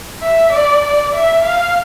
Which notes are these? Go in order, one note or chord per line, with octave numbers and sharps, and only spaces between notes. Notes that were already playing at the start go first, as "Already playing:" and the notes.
E5
D5
D5
E5
F5